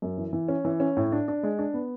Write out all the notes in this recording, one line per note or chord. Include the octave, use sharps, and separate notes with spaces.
F#2
E3
E3
C#4
E3
C#4
A2
D4
D4
G#3
D4
B3